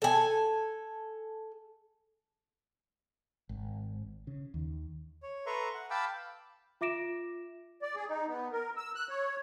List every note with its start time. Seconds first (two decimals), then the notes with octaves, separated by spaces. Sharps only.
0.02 A4 G#5
3.49 G#1
4.27 C#3
4.54 D#2
5.23 C#5
5.46 A4 B4 E5 A#5 C6 C#6
5.74 F#5
5.90 F5 G5 A5 B5 D6 E6
6.81 F4 E5 D6 A#6 D7 E7
7.82 D5
7.95 G#4
8.09 D#4
8.27 B3
8.52 A#4
8.77 E6
8.96 F#6
9.09 C#5